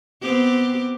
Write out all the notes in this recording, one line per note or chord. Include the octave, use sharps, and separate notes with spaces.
B3 C4 G4